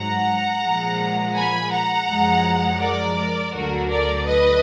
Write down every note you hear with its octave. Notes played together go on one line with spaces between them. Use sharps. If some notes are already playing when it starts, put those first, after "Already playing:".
Already playing: G#2 F#3 F#5 A#5
A#2 F3 G#3
G#5 B5
F#5 A#5
F#2 F3 G#3
A#4 D5
D2 D3 F#3 F#4 A#4
A#4 D5
B4 D#5